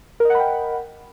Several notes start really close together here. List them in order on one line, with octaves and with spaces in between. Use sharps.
A#4 D#5 F#5 B5 G5